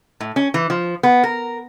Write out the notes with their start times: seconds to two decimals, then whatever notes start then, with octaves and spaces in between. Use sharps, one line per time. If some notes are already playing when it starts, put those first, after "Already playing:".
0.20 A2
0.36 C#4
0.54 E3
0.70 F3
1.03 B3
1.23 A#4